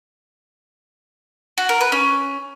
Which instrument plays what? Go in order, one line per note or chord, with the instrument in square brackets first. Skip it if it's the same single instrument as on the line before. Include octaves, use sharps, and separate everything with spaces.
[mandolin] F#4
A#4
B4
C#4